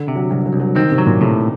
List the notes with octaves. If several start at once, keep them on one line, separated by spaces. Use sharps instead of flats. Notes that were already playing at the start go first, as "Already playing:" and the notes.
Already playing: D3
C3
F#3
C2 F#3
F#3
C2
F#3
D#3 C4
C3
F#3
A#2
A2 C3